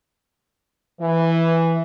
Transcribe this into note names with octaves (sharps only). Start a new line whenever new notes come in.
E3